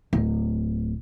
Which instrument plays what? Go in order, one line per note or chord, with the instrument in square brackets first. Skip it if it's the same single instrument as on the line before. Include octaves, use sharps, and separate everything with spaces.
[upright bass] D1